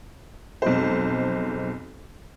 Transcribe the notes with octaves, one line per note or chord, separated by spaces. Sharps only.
B1 F2 G#3 C5